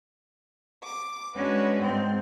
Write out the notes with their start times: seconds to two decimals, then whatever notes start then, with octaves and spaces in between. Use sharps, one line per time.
0.84 D6
1.34 G#3 C#4 D4 F#4 B4
1.81 G#2 C4